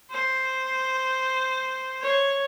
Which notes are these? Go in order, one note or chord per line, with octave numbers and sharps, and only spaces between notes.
C5
C#5